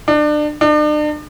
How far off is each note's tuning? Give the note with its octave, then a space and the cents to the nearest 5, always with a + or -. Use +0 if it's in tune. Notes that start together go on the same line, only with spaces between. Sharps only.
D4 +30
D4 +40